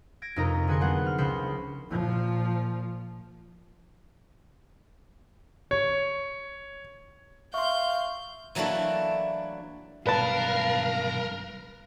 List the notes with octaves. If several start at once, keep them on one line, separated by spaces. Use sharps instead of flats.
G#6 A#6 D7
F2 C3 D#4 A#4 A#5
D3 G#4 B4 G#5 C6 C#7
F#3 G3 B3 C5 F#5
F6
C#2 C#3 F3 C5 B5 C#7
A#2 F3
C#5
E5 F5 C6 C#6 G6
E3 F#3 A3 A#3 D4 E4
B1 G2 A#4 B4 F5 A5